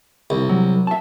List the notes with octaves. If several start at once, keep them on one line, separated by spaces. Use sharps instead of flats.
C2
F#3
E5 A5